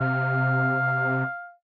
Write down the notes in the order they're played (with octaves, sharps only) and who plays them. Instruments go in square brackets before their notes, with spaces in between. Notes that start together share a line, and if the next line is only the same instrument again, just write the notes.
[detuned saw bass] C3 [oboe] F5